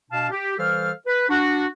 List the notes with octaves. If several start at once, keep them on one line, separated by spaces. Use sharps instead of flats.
B2 D4 F5 A5
G4
E3 G3 A4 C5 F5 F6
B4
D4 F#4